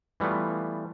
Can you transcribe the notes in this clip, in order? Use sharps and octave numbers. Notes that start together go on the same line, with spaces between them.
E3 G3 A3 B3 F4